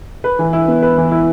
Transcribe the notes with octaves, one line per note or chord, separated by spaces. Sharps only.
B4
E3
E4
B3
B4
E3
E4